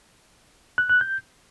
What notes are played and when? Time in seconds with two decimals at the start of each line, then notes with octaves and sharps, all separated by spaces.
0.78 F#6
0.90 F#6
1.01 G6